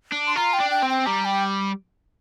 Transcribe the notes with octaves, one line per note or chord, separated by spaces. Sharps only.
D4
C6
F4 A#5
G5
D4
G5
C4
G5
G3 A#5
G5